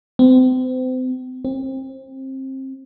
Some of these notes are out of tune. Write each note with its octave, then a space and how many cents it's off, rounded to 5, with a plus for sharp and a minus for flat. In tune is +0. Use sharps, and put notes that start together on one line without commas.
C4 -35
C4 +25